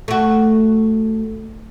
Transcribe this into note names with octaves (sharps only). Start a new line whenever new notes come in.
A3 F#4